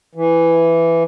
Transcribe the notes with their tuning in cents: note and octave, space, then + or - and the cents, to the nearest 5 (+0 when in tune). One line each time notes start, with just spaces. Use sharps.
E3 +10